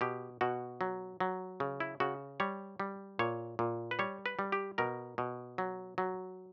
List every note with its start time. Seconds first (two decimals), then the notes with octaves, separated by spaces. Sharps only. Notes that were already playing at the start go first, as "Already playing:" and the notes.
0.01 B2 G4
0.41 B2 F#4
0.81 F#3
1.20 F#3
1.60 C#3
1.80 E4
2.00 C#3 F#4
2.40 G3 C#5
2.80 G3
3.19 A#2 C#5
3.59 A#2
3.91 B4
3.99 G3 C#5
4.26 B4
4.39 G3
4.52 G4
4.78 B2 A#4
5.18 B2
5.58 F#3
5.98 F#3